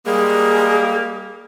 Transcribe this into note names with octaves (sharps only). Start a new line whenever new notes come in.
G3 G#3 A#3 G#4